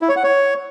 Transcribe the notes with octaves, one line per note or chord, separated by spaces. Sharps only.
E4
C#5
F#5
C#5